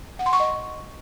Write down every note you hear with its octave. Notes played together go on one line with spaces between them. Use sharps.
F#5
C6
C#6
D#5